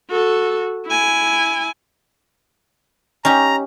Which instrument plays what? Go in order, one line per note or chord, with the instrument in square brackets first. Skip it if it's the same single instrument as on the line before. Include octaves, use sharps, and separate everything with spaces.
[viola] F#4 A4
E4 G#5
[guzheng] C#4 D#4 G4 [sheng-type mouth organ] A#5